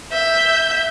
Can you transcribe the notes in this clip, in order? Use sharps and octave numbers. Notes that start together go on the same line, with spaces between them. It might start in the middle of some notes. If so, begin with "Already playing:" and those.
E5 G6